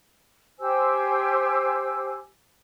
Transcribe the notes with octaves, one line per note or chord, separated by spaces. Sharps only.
G4 C5 G#5 E6